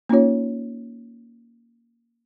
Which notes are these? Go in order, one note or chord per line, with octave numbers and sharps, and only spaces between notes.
A#3 C#4 D#4 F4 C#5